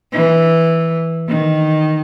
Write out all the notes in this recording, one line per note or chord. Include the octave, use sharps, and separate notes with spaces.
E3
D#3